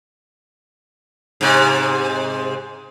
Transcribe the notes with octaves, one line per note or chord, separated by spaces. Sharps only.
G#2 C3